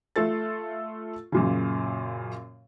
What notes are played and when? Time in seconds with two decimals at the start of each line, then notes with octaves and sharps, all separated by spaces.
0.16 A3 F4 A4 A6
1.32 F#2 A#2 C#3